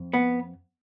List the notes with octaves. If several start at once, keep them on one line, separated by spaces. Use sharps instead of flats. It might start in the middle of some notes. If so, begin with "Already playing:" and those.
Already playing: F2
B3